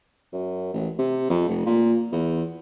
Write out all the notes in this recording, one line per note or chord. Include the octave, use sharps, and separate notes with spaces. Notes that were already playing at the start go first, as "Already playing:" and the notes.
F#2
A1
C3
F2
F1
A#2
E2